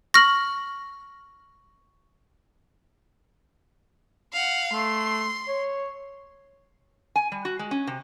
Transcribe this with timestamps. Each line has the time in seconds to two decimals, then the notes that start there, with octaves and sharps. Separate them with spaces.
0.14 C#6 F6 A#6 F#7
4.33 F5 F#5
4.73 A3 C6
5.48 C#5
7.16 G#5
7.32 G3
7.45 F#4
7.59 G#3
7.71 C#4
7.87 C3